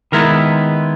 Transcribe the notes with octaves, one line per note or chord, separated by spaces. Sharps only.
D#3 G#3 B3 E4 A#4